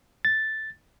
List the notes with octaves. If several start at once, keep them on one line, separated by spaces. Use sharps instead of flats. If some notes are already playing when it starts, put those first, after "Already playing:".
A6